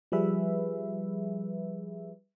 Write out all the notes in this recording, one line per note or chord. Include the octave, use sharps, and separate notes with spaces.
F3 G3 G#4 B4 E5